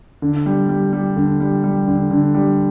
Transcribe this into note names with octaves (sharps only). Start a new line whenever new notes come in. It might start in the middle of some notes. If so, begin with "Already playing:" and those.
D3
G3
G3
G3
D3
G3
G3
D3
D3
G3